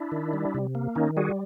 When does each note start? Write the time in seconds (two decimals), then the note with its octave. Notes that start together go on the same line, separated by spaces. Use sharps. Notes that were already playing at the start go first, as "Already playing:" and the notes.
Already playing: D4 E4
0.12 D#3
0.33 G3
0.54 C3
0.75 A#3
0.95 D#3 C#4 D#4
1.17 G3 F#4 G#4